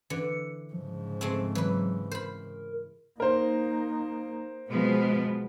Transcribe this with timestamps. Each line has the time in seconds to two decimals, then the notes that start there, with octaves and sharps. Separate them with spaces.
0.10 D3 E3 C#7
0.73 G#2 C#3 F3
1.21 G#3 A3 C4
1.55 E3 F#3 B4
2.11 A#4 C5 B5
3.20 A#3 D#4 A#4 C5
4.69 B2 F3 G#3 B3